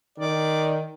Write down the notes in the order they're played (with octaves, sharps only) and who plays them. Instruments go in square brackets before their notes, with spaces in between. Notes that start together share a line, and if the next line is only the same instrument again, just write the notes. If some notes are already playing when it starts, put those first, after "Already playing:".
[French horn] D#3 [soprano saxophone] D5